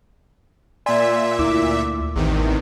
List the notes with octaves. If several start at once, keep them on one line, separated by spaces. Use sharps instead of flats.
A#2 D5 E5 G#5 C6
D2 E4 D6
A1 E2 C3 D#3